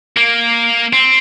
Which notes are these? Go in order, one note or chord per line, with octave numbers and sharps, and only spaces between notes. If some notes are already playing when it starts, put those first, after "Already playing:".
A#3
C4